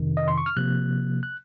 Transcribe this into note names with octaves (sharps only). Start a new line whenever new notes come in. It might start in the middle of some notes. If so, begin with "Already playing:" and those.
Already playing: F2 C3 D#3
D#5
C6
C#6
F6
C3 F3 A#3 F#6
F#6